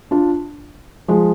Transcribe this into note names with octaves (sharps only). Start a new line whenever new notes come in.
D4 F4
F3 G#3